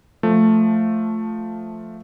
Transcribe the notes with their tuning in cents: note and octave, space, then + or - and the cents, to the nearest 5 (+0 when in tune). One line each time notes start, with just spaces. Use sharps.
F3 +5 A3 +0